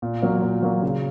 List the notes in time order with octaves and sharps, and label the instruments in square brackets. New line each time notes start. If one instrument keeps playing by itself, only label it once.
[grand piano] A#2
F#3 A#3
A#2
F#3 A#3
C#3